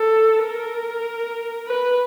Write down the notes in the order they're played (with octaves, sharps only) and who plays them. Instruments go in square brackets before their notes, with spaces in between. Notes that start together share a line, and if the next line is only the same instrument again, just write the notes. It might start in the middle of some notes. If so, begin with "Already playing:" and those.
Already playing: [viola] A4
A#4
B4